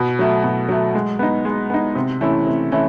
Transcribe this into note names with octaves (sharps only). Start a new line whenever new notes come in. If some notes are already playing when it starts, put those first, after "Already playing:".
Already playing: B2
F#3 A3
B2
F#3 A3
G#3
B3 D#4
G#3
B3 D#4
C3
E3 A3 C#4 E4
C3
E3 A3 C#4 E4